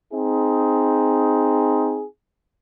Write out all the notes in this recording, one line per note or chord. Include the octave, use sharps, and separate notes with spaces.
C4 D#4 G#4